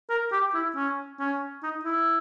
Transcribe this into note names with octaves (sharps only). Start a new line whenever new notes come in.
A#4
G4
E4
C#4
C#4
D#4
E4